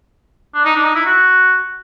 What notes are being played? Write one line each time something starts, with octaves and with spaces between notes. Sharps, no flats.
D4
D#4
D4
D#4
E4
F#4